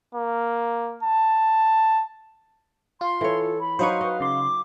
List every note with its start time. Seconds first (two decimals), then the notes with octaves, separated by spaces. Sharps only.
0.15 A#3
1.03 A5
3.01 F4 C6
3.21 E3 A4 C#5
3.60 B5
3.79 F#3 D#4 B4 C5 F5 C#6
4.01 B4 D#5
4.20 C#3 C6 D6